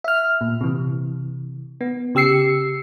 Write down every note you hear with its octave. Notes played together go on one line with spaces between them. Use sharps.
E5 F6
A#2
C3 E3
B3
C#3 G4 E6 C7 C#7